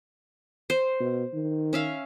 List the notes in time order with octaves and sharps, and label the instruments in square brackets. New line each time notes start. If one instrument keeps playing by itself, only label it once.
[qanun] C5
[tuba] B2
D#3
[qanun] C#4 E5 F5